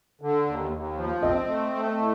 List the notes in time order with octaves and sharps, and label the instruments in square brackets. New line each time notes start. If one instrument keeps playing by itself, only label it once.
[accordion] D3
D#2
D#2
F3
[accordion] C4 [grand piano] D#5
[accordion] A3
A3
A2